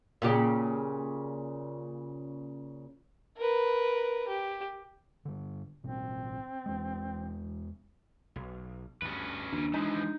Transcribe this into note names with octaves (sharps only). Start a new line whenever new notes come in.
A#2 C#3 G4
A#4 B4
G4
G2 D3
A1 B2 C4
E2 G#3
B1
D2 G2 C#4 B4
D#2 C#3 D4
E3 F3 G#3 D#4